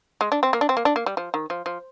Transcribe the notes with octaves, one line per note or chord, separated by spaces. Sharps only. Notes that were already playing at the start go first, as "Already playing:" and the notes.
G#3
D4
C4
A#3
D4
C4
A#3
D4
A#3
G3
F3
D#3
F3
F3